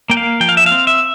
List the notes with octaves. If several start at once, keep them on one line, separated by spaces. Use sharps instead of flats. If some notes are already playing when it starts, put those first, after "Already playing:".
A#3 G5
F5
F3 G5
F5
E5
F5
C4
E5